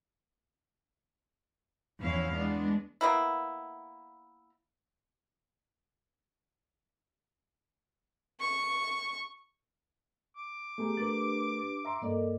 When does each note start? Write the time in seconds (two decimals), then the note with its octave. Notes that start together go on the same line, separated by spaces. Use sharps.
1.99 E2 F3 C#4 E4 F5
2.30 G#3 B3 D4
3.01 A#3 B3 E4
8.40 C#6
10.36 D6
10.78 A3 B3 G4 G#4 A#5
10.97 A3 D4 G4 A#4 B4 A6
11.85 E5 A#5 C6
12.02 G2 A#3 A4 A#4 D5 D#5